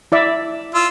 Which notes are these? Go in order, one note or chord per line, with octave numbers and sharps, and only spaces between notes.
E4 D5 E5
F4 E6